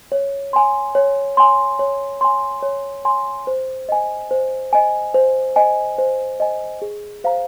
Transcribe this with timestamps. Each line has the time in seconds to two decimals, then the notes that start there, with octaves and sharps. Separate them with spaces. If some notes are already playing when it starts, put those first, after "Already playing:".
0.12 C#5
0.53 G#5 C6
0.95 C#5
1.37 G#5 C6
1.79 C#5
2.21 G#5 C6
2.63 C#5
3.05 G#5 C6
3.47 C5
3.89 D#5 G#5
4.31 C5
4.73 D#5 G#5
5.14 C5
5.56 D#5 G#5
5.98 C5
6.40 D#5 G#5
6.82 G#4
7.24 C5 F5 A#5